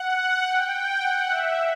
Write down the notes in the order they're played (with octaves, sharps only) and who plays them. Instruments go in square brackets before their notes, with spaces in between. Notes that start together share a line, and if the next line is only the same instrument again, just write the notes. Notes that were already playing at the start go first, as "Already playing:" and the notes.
Already playing: [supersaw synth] F#5
G5
F#5
E5